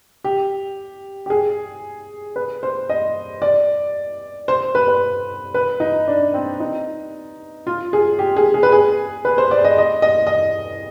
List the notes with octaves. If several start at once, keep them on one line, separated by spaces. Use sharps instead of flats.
G4
G4
G#4
B4
C5
D#5
D5
C5
B4
B4
B4
D#4
D4
C4
D#4
F4
G#4
G4
G#4
G#4
B4
G#4
B4
C5
D5
D#5
D#5
D#5
D#5